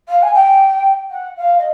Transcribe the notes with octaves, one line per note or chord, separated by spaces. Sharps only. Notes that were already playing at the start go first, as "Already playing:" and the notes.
F5
G#5
G5
F#5
F5
D#5